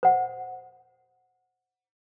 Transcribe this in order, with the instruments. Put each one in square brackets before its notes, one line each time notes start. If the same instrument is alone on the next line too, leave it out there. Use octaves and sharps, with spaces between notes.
[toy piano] C5 F#5